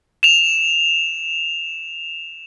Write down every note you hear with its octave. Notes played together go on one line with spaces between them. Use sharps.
E7 F7